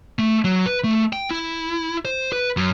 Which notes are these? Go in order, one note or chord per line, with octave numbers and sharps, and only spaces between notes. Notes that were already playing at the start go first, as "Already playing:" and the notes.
A3
F#3
B4
A3
G5
E4
C5
B4
F#2